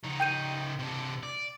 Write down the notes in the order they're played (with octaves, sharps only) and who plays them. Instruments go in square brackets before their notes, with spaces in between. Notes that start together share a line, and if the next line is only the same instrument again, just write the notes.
[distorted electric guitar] C#3 D#4
[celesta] G5 G6 D#7
[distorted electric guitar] C3 D4
D5